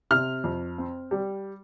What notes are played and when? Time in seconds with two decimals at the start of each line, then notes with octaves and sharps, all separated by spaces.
0.11 C3 F6
0.44 F2
0.78 C4
1.11 G3